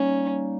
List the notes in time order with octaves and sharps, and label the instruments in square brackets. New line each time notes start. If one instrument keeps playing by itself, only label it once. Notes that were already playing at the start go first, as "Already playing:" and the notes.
Already playing: [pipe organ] G3 A#3 D#4 [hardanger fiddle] C#4